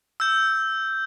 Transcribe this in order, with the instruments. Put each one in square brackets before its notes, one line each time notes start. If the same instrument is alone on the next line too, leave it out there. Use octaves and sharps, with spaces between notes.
[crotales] E6 G6